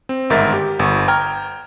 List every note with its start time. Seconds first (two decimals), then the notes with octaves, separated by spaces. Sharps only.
0.09 C4
0.30 G1 G#2 D#3 A#4 E5 A6
0.53 G4
0.79 G1 C#6
1.08 G5 A#5 F6 G#6